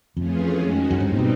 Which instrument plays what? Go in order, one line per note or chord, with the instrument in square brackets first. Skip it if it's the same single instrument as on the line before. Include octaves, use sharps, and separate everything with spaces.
[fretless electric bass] F2 [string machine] E3 A3 C#4 F4 G#4
[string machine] D#3 G#3 C#4 F#4
[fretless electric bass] F#2 [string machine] G3 C4 D#4
[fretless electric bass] G2
A#2
B2